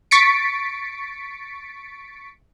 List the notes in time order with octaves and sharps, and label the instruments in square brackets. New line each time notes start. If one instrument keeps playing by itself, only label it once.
[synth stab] C#6 A6 B6 C#7 D7